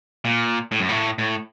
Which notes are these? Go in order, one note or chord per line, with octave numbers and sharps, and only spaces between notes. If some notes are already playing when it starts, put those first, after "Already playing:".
A#2
A2
F#2
A2
A2